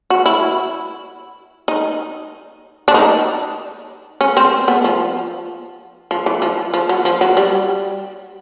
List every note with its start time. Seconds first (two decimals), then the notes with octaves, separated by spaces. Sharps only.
0.10 F#4
0.26 E4
1.68 D#4
2.88 D4
2.94 D#4
4.21 C#4
4.37 C4
4.68 B3
4.84 F3
6.11 F3
6.26 E3
6.42 F3
6.74 F3
6.89 F#3
7.05 F3
7.21 F#3
7.37 G3